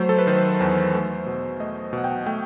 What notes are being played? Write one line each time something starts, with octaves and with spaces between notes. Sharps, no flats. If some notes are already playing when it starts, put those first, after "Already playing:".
Already playing: F#3 A3 C5
A4
B4
D#3 C5
E2
A3
B2
A3 D#5
B2 F#5
G5
A3 G5